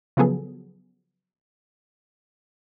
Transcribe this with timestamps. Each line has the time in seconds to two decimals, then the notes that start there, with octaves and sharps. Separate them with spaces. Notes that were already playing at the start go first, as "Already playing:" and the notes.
0.17 C#3 F3 F#3 B3 G#4 A4